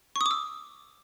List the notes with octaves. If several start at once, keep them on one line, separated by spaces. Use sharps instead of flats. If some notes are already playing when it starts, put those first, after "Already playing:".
C#6
D#6
D6
E6